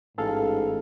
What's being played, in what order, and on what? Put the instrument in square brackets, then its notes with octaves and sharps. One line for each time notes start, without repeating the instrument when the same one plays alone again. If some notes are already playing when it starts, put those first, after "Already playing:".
[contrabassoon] A1 [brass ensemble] G#2 [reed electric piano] G#4 A4 F5